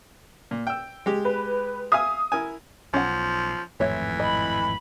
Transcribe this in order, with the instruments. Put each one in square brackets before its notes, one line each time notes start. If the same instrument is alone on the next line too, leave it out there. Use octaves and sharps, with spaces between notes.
[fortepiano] A#2
G5 E6
G#3 G4
[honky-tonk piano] B4
[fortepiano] E5 F5 G#5 [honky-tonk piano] D#6
[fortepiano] E4 A#4 G#5
[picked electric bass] B1 [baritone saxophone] F3 [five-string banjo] C#4 F#5
[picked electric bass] G#1 F2 A2 [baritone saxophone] E3 [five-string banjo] C#5 E5
[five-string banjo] D#5 [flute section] B5